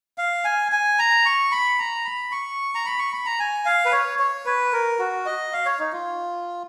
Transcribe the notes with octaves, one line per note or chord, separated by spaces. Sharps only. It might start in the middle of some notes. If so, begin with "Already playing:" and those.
F5
G#5
G#5
A#5
C#6
B5
A#5
B5
C#6
A#5
B5
C#6
B5
A#5
G#5
F5
B4
C#5
C#5
B4
A#4
F#4
D#5
F5
C#5
D#4
F4